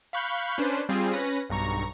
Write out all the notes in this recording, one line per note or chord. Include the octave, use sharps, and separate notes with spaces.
F5 B5 C#6 F#6 G6
C#4 D4 B4 C5
G3 C4 F4 G#4
C#4 B4 A#6
B1 G2 A#5 C#6